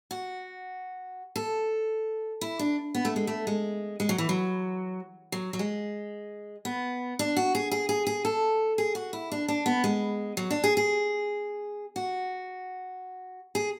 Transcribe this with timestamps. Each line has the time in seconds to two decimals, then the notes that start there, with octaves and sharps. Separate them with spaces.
0.11 F#4
1.36 A4
2.41 E4
2.59 D4
2.95 B3
3.05 A3
3.16 G#3
3.27 A3
3.47 G#3
4.00 G#3
4.09 F#3
4.18 E3
4.29 F#3
5.32 F#3
5.53 F#3
5.59 G#3
6.65 B3
7.19 D4
7.37 F#4
7.55 G#4
7.71 G#4
7.89 G#4
8.07 G#4
8.25 A4
8.78 G#4
8.95 F#4
9.13 E4
9.32 D4
9.48 D4
9.66 B3
9.84 G#3
10.37 F#3
10.50 D4
10.64 G#4
10.77 G#4
11.96 F#4
13.55 G#4